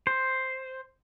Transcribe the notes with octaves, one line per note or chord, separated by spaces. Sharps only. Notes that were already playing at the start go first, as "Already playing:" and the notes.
C5